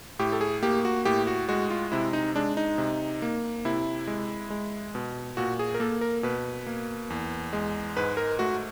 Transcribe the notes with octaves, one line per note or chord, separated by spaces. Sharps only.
A2 G4
A4
G#4
A#3 G4
F#4
A2 G4
F#4
G#3 F#4
F4
C3 E4
D#4
G#3 D4
D#4
C3
A#3
C3 E4
G#3
G#3
B2
A#2 F#4
G#4
A#4
A#3 A4
A#4
B2 B4
A#3
E2
G#3
G#2 B4
A#4
A3 F#4